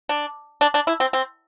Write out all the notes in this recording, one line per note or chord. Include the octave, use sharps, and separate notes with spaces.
D4
D4
D4
E4
C4
C4